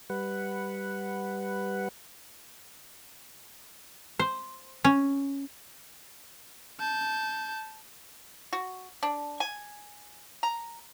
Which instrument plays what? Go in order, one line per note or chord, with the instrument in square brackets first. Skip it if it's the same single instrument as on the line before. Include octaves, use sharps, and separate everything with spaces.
[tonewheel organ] G3 B4 F#5
[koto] C5
C#4
[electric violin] A5 G6
[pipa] F#4
D4
G#5
A#5